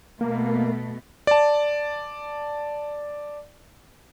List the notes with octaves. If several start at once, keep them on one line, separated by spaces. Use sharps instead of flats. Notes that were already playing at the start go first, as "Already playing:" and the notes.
B2 A3 A#3
D5 A5